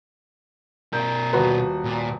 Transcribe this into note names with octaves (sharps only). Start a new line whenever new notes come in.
B2 A#4 G6
D#1 F#4 B4
A#2